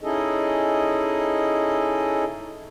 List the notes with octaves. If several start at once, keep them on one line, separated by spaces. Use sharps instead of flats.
C#4 D#4 E4 G#4 A4 D#5